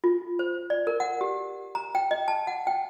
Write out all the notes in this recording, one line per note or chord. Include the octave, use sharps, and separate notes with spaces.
F4
C5
D5
A#4
F#5
G4
A#5
G5
D#5
A5
F#5
G5